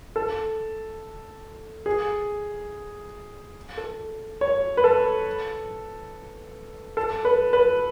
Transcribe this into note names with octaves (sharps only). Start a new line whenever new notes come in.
A4
G#4
A4
C#5
B4
A4
A4
B4
B4